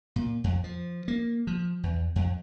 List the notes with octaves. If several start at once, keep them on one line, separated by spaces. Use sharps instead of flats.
A#2
F2
F3
A#3
F3
E2
F2